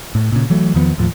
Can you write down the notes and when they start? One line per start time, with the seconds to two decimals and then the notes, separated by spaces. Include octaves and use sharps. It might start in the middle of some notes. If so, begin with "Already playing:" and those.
0.15 A2
0.32 A#2 C#3
0.50 E3 F#3 A3
0.74 E2 D#3 F3 B3
0.98 D#2 A2 F3